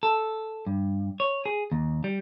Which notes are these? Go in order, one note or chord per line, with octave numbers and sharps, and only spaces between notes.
A4
G2
C#5
G#4
D#2
G3